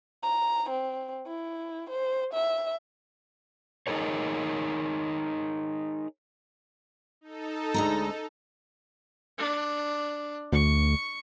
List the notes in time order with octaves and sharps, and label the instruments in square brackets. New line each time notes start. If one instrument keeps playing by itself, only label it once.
[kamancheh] A#5
C4
E4
C5
E5
[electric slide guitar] D#4 E4 G#4 A#4 C#5
[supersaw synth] D#4 A4
[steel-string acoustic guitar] D2 G#3 A#5
[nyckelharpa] D4
[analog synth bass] D2 [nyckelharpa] C#6